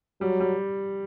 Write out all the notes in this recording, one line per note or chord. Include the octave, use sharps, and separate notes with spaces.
F#3 G3
G3